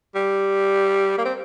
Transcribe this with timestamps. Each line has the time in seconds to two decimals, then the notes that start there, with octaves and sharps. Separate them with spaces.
0.15 G3
1.18 A#3
1.25 C4